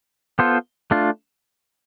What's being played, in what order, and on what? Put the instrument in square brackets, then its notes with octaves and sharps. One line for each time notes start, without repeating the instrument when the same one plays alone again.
[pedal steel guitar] B3 F4 A4 C5
A3 D4 F4